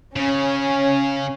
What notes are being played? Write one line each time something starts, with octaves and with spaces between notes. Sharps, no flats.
C#3 C#4